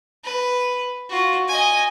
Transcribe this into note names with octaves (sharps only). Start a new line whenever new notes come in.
B4
F4 F#4
D#5 G#5